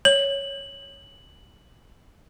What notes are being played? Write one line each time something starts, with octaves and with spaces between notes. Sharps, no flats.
C#5 F#7